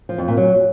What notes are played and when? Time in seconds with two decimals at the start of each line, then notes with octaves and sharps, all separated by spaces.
0.09 F3
0.18 F2
0.28 A#2
0.37 F#3